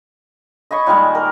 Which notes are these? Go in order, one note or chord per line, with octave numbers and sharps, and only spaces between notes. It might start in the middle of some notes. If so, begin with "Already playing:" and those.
D#5 G#5 B5 C#6
A#2 D#3 G3 G#3
A#4